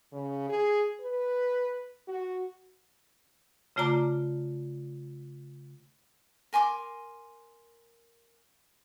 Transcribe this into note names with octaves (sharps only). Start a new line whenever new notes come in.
C#3
G#4
B4
F#4
C#3 A3 F4 D5 A#5 D6
A#4 G#5 C6 D6